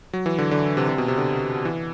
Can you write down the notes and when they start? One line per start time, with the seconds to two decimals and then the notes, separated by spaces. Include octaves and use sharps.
0.13 F#3
0.26 E3
0.38 D3
0.51 D3
0.77 C3
0.89 C3
0.98 B2
1.08 C3
1.17 D3
1.65 E3